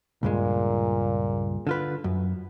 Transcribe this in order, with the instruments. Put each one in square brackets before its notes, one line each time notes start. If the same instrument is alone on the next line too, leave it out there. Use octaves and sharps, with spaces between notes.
[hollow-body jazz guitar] C#2 G2 G#3 [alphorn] A#2
[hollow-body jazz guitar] D3 F4 B4
F#2